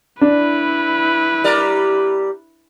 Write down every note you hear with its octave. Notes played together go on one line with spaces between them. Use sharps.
D4 E4 B4
G3 A#4 D5